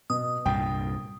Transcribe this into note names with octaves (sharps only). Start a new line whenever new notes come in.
B2 D#6
C2 G2 A#2 G5